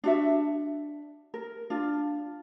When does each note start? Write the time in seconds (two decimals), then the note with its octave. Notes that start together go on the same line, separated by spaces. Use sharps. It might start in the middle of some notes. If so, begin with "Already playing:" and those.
0.04 D4 F#4 E5
1.34 A#4
1.70 D4 F4